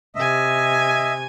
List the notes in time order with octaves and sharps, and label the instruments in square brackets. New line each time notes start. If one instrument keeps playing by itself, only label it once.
[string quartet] C3 G#5 [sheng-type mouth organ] D#5 E5